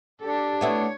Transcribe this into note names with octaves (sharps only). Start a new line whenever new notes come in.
D4 G4 A4
A3 B3 E4 C#5